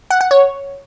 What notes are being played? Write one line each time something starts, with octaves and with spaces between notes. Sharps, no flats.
F#5
F#5
C#5